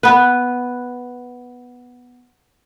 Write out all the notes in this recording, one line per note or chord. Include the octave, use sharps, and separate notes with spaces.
B3 B4